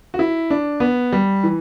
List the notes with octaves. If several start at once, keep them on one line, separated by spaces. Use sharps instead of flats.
F#4
E4
D4
B3
G3
E3